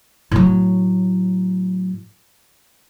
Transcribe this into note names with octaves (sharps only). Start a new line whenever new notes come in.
A2 F#3